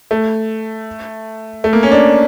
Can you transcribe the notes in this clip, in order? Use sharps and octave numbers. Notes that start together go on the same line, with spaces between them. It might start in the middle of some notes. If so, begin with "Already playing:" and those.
A3
A3
A#3
C#4
D4